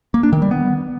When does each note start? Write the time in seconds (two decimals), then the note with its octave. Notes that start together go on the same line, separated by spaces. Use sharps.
0.14 A#3
0.23 D4
0.33 D#3
0.42 G3
0.51 B3